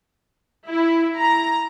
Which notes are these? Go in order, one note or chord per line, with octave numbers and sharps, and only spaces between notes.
E4
A#5